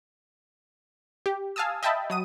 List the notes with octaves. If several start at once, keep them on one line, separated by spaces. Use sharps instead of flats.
G4
F5 G#5 A5 D#6 E6
D#5 E5 G5 A5 B5
F#3 D#6 D#7